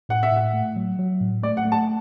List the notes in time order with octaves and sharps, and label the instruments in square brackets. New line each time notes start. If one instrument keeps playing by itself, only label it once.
[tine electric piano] A2 [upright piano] F#5
[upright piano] E5
[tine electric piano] A2 [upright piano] F#5
[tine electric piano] A3
F#3
F#3
A2
[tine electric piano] A3 [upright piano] D5
[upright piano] F#5
[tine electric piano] A3
[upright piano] A5